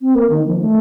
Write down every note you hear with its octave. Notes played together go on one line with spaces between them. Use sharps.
C4
A#3
D#3
F3
A3